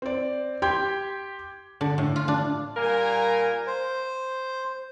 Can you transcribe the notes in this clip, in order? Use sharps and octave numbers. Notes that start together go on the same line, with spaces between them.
C4 D5
G4 G5 C6 G6 G#6
D3
A2
F4
D4
A#2 G3 A#3 A#4 G#5 A#5
C5